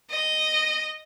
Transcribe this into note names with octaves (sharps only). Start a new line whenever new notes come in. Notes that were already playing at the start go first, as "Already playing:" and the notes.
D#5